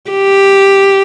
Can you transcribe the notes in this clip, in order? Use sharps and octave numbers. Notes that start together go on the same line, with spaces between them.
G4